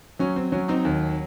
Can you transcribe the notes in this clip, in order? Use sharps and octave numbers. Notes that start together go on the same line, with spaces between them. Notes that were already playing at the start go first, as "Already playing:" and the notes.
F#3 C#4
C4
F#3 C#4
C4 D#4
D#2